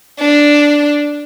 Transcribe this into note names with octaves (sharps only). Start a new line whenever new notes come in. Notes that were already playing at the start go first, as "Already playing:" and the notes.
D4